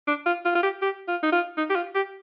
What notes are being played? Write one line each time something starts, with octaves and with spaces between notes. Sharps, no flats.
D4
F4
F4
F4
G4
G4
F4
D#4
F4
D#4
G4
F4
G4